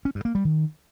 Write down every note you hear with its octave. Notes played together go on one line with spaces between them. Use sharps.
C#4
G2
A#3
G3
D#3